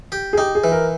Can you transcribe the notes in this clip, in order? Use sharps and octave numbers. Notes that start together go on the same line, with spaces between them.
G4
G#4
D#4 G4
G#4
E3
A#4